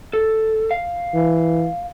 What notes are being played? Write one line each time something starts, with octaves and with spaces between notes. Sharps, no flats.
A4
F5
E3